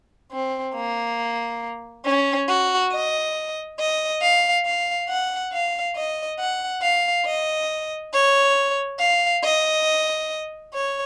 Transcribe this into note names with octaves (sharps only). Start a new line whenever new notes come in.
C4
A#3
C#4
F#4
D#5
D#5
F5
F5
F#5
F5
D#5
F#5
F5
D#5
C#5
F5
D#5
C#5